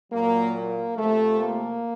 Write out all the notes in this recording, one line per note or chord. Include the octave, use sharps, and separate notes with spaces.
A#2 F#3 A#3
A#3
C3 F3 A3
A#3